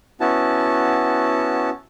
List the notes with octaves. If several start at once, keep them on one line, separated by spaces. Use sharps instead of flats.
B3 C#4 E4 F#4 A5